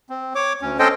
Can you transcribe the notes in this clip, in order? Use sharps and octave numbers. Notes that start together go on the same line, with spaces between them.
C4
C#5 D6
D2 C#4
C4 C#4 A4 C5 D#5 G5